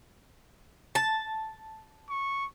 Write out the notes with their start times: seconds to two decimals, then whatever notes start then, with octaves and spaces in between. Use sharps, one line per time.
0.95 A5
2.10 C#6